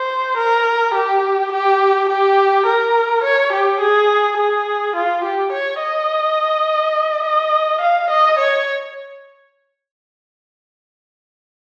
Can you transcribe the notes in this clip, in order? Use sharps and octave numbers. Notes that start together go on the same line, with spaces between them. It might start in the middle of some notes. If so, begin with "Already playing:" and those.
Already playing: C5
A#4
G4
G4
G4
A#4
C#5
G4
G#4
G#4
F4
G4
C#5
D#5
D#5
F5
D#5
C#5